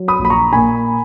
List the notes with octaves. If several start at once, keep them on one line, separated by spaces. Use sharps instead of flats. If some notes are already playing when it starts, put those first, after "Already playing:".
Already playing: F#3
B5 D#6
A#1
B5
A#5 C#6
A#2 G#5 B5